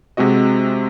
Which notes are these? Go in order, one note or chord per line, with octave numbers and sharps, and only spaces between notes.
C3 G#3 C4 F#4 D#5